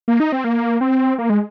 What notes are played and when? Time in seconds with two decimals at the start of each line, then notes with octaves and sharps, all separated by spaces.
0.08 A#3
0.20 D#4
0.32 C4
0.44 A#3
0.81 C4
1.18 A#3
1.30 G#3